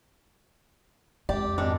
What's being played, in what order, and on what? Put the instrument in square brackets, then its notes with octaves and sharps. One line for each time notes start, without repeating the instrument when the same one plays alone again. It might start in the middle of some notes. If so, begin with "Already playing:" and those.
[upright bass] F2 G#3 [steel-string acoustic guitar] G4 [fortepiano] D5
[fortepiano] G#1 [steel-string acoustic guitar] D4 D#4 G4